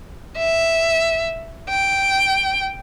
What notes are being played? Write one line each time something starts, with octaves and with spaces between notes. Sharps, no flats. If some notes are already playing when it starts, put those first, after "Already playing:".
E5
G5